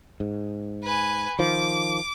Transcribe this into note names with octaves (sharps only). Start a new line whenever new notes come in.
G#2
B4 G#5
D#3 F3 D6